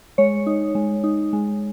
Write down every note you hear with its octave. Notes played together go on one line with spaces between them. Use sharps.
G#3 C#5
D#4
G#3
D#4
G#3